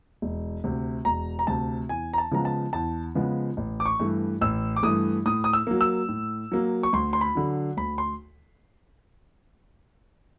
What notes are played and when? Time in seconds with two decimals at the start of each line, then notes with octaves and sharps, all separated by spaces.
0.22 E1
0.64 D2 C3
1.05 E1 A#5
1.39 A#5
1.47 D2 C3 A5
1.89 E2 G#5
2.13 A#5
2.18 A5
2.31 C#3 F3 G#3 B3 A#5
2.45 A5
2.73 E2 A5
3.15 C#3 F3 G#3 B3
3.57 A1
3.80 D6
3.86 C#6
3.99 G2 E3 A3
4.41 A1 E6
4.76 D6
4.83 G2 E3 A3 D#6
5.26 A2 D#6
5.44 D#6
5.53 E6
5.67 F#3 A#3
5.81 E6
6.09 A2
6.52 F#3 A#3
6.83 C#6
6.93 D2 C6
7.13 C6
7.21 B5
7.35 D3 F#3
7.77 D2 B5
7.98 C6